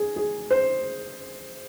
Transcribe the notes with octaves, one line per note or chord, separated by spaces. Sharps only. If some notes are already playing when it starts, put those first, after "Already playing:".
Already playing: G#4
G#4
C5